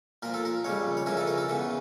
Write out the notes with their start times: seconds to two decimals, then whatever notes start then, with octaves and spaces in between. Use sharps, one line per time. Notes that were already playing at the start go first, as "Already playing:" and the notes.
0.22 A#2 F3 A#4
0.34 A4
0.45 A#4
0.64 F2 C#3 G3 C#5
0.97 C#5
1.06 F2 C#3 E3 A#4
1.17 A4
1.27 A#4
1.38 A4
1.49 E2 C#3 E3